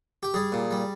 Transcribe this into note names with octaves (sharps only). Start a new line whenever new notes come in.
G4
G3 G#4
A#2
G3